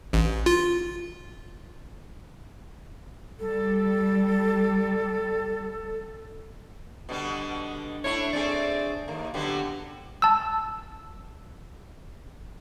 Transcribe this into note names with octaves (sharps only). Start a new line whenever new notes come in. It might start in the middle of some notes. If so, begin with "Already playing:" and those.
A1
F4
G3 A4
B2 D3 G3
A3 D4 E4 C#5
A3 C4 G#4 D5
D#2 A#3
D3 F#3 B3 G4
A5 E6